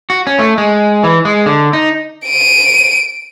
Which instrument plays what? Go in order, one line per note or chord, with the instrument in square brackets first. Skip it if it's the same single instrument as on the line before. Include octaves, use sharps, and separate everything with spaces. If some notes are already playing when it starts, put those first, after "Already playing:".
[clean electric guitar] F#4
C#4
A3
G#3
E3
G#3
D3
D#4
[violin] D7 D#7